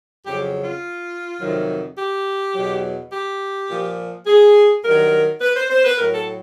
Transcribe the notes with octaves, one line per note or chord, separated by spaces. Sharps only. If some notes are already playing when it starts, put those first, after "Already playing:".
F2 C#3 F#3 G4
F4
F2 C3 D#3 F#3
G4
E2 B2 F#3
G4
A#2 F3
G#4
G2 D#3 F#3 A#4
B4
C5
C5
B4
A2 F#3 A#4
A4